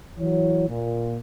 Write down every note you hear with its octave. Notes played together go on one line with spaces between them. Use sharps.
E3 F#3 E4 C#5
A#2